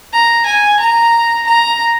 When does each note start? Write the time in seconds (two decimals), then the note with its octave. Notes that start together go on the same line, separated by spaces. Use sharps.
0.13 A#5
0.46 G#5
0.79 A#5
1.47 A#5